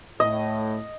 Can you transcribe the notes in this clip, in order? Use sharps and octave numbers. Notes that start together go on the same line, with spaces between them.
A2 D#5